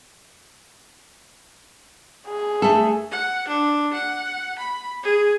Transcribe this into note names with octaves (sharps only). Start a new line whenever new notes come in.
G#4
A3 A4
F#5
D4
F#5
B5
G#4